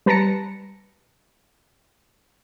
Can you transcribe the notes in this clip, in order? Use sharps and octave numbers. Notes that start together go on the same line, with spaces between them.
G3 B4 A5 A#5 A#6 C#7